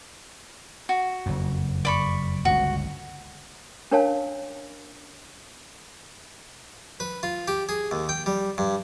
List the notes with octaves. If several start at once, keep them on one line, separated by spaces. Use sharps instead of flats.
F#4
F#1 F2
D5 B5 C#6
G1 C#2 F#4
C#4 D4 A#4 C#5 F5 A5
B4
F4
G4
G#4
D#2
G5
G3
G2